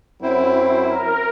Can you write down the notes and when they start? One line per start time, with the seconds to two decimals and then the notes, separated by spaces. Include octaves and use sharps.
0.22 F#2 F#3 C4 E4
0.89 A#4